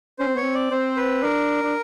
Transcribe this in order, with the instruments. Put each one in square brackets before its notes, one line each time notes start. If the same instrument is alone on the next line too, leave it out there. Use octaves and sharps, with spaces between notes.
[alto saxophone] C#4 [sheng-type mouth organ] C5
[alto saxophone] C4
[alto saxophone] B3 [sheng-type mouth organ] C#5
[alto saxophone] C4
[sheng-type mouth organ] D5
[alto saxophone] C4 [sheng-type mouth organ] C5
[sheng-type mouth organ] B4
[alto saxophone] D4 [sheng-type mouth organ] A#4
[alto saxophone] D4